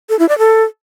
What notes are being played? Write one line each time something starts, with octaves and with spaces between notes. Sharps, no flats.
A4
E4
D5
A4